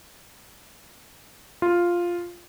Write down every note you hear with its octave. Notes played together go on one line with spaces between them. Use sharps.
F4